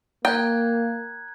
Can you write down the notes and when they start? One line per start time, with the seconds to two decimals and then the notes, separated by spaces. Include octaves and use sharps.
0.25 A#3 G5 A#5 F#6 G#6